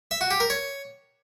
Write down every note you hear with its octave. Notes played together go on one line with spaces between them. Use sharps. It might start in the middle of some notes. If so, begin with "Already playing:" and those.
E5
F#4
G4
A#4
C#5